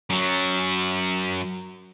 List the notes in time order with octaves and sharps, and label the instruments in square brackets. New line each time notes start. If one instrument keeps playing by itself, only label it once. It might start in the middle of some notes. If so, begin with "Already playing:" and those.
[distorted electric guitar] F#2 F#3